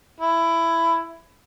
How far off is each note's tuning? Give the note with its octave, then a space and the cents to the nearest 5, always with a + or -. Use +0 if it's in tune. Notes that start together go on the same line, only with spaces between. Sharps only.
E4 +15